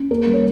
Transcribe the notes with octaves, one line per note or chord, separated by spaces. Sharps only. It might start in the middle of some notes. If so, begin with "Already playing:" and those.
Already playing: C#4
A#3 A#4
G3
C#5